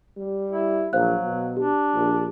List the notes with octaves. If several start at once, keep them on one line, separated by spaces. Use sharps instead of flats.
G3
E4
A#1 F#3 C5 F5 F#6
B2
D4 G4
A#1